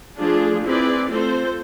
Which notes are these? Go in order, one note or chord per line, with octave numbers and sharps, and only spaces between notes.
F3 A3 D4 F4 G#4
C4 E4 G#4 B4 D5
A3 C4 F4 A4 C5